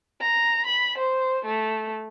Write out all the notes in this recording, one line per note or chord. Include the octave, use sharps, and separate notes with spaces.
A#5
B5
C5
A3